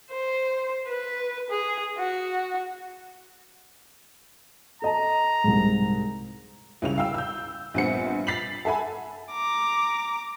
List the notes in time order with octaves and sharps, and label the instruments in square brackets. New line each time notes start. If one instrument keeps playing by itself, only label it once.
[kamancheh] C5
B4
G#4
F#4
[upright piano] A4 D#5 A5 [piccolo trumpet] A#5
[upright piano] C2 G#2
[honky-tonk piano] C2 C#3 F7
F5 G5 E6
E6 G6
A#1 G2 B3 C4 C#7
A6 B6 C7 F7 F#7
A4 E5 F#5 G#5 B5
[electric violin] A#5 D6